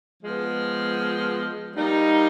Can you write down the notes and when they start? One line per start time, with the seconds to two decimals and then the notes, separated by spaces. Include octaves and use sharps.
0.22 F3 G#3 B3
1.75 G3 A#3 D#4